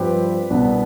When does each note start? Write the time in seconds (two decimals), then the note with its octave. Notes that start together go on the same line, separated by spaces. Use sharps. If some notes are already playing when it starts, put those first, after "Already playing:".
Already playing: G2 F3 C4 G4 B4
0.50 C2 B2 B3 D4